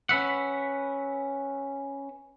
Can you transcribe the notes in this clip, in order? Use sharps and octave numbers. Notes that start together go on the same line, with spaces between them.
C#4 B4 E5 F#5